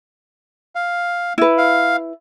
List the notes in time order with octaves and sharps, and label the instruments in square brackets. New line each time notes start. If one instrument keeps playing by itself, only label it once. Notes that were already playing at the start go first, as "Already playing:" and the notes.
[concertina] F5
[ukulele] E4 B4
[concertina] F5